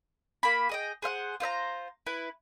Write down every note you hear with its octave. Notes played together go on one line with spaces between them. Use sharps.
A#3 B5
G#4 D#5 G5
G#4 C5 F5 F#5
F4 C5 E5 A#5
E4 B4